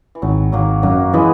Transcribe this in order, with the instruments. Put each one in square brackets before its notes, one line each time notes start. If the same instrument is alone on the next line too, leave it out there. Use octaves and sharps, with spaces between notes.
[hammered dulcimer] E3
[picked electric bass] G#1 [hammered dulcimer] F#3
[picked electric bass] G#1 [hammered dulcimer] F#3 A#3
[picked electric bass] F#2 [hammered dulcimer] F#3 A#3
[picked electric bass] E3 [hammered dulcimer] G#3 B3